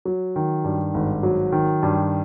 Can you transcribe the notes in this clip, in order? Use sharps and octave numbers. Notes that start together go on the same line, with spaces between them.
F#3
D#3
G2
G#1
F#3
D#3
G2